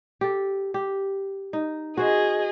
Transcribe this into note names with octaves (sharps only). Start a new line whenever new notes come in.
G4 A4
G4
D#4
F#4 G#4 C5 D#5